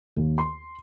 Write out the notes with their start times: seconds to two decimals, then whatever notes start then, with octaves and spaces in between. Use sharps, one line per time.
0.16 D#2
0.38 C6